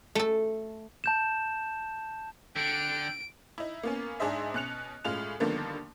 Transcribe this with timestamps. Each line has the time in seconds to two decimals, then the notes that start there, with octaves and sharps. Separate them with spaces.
0.15 A3 A4
1.04 A5 G6 E7
2.56 D3 G5 D7
3.58 D#4 E4
3.83 A#3 B3 C#4
4.20 G#2 D4 G#4 C5 D#5 E5
4.54 B2 C#4 F#6 C#7 F7
5.04 A2 G#3 C#4 F4 F7
5.40 D3 D#3 F3 G3 A#3 B3